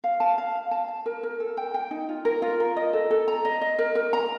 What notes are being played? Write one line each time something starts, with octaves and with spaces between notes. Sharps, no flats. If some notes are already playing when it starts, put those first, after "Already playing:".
F5
A5
F5
F5
A5
A5
A#4
A#4
A4
G5
G5
D#4
F4
A#4
F4
A#4
D#5
A4
A4
A#5
D#5
D#5
A#4
A#4
A#5